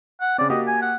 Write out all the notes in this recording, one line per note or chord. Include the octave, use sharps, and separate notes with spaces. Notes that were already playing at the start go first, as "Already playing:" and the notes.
F#5
C#3 C4 D5
A#3 F#4 G4 D#5
G#5
F#5